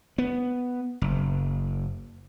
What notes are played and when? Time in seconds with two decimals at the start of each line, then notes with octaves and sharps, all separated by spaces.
0.18 B3
1.02 F#1